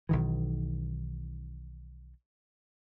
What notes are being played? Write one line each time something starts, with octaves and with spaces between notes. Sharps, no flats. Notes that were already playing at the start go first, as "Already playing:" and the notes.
B1 D#3 E3